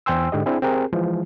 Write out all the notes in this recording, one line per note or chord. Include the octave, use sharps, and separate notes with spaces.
E2 C5 G5 G#5 C6 E6
G#2 D3 G4 D#5
C4 D4 E4 G#4
C4 G4 G#4 A#4
E3 F3 G#3